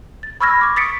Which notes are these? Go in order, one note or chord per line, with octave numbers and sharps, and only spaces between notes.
A6
B5 C#6 E6 F6 G#6 A#6
C#6 D6
D#6 A6 B6 C#7 D7